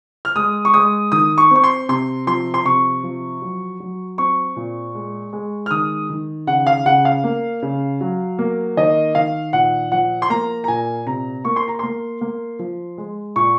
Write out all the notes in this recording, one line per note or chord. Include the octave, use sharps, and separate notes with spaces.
F6
G#3 D#6
C#6
G#3 D#6
D#3 D#6
C#6
C4 C#6
C6
C3 C6
F3 C6
C6
C3 C#6
F3
F#3
F#3
C4 C#6
A#2
G#3
G#3
F6
D#3 D#6
D#3
C#3 F#5
F5
C#3 F#5
F5
A#3
C#3
F#3
A#3
D#3 D#5
D#3 F5
A#2 F#5
F3 F#5
C6
A#3 A#5
A#5
A#2 G#5
C3 A#5
A#3 C#6
C6
A#5
A#3 C6
A#3
F3
G#3
A#2 C#6